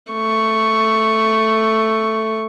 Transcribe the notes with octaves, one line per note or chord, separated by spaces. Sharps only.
A3 C#6